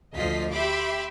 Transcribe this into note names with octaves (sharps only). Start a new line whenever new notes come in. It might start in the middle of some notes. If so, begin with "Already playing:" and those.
D2 F3 F4 D#5 B6 C7
G4 E5 B5 C6 D6